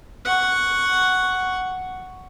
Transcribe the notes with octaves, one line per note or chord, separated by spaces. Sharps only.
F#5 C#6